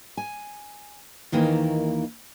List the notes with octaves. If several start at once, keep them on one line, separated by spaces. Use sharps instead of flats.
G#5
D#2 D#3 E3 A#3